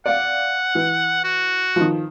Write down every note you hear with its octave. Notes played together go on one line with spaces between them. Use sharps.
D5 F5 F#5
E3
F#4
D#3 F3